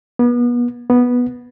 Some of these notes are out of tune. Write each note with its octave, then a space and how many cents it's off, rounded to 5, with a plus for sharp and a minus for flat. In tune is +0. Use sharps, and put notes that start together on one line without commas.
B3 -35
B3 -10